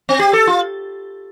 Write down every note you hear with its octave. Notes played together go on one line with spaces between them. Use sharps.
C4
G4
A4
F4